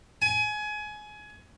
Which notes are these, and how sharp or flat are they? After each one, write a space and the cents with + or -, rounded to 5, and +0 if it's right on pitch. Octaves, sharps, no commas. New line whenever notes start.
G#5 +25